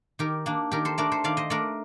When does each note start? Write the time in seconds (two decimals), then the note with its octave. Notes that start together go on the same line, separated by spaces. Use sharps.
0.19 D#3 G4 A#4
0.46 A#3 D4
0.72 D#3 G4 A#4
0.85 A4 C5
0.98 A3 D4 A#4 D5
1.12 A4 C5
1.24 D#3 D5 F5
1.37 C5 D#5
1.50 A3 D4 A#4 D5